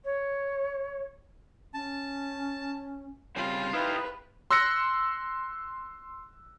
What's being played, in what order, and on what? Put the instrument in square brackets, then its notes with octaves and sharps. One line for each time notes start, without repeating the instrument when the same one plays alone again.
[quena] C#5
[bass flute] C#4 [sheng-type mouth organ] A5
[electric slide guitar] C#3 G3 C4 [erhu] F4
[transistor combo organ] D#4 F5 [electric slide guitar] E4 G4 [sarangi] B4
[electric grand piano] C6 E6 F#6 A#6 C#7